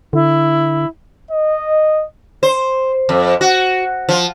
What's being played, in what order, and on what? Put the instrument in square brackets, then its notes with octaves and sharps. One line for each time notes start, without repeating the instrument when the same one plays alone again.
[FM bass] D3 [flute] E4
[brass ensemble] D#5
[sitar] C5
F2
F#4
F3